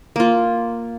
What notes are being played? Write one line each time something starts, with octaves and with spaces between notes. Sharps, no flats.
A#3 F4